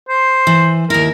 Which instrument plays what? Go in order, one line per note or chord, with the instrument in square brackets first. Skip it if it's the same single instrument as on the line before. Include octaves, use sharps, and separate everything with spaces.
[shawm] C5
[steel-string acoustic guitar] E3
[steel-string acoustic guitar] D#2 E4 [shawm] A#4